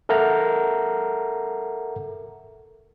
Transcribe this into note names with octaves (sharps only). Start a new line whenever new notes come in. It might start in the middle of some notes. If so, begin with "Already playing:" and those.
A4 A#4 E5 F#5 A#5